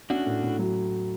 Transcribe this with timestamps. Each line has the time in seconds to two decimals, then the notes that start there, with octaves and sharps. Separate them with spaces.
0.10 C#4 D4 F#4
0.26 A2
0.43 A2
0.59 F#3